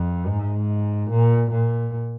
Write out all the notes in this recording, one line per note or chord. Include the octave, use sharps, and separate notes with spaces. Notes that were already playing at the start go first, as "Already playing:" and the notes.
Already playing: F2
G#2
A#2
A#2